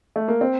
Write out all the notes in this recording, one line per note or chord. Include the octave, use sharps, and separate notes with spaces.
A3
A#3
C4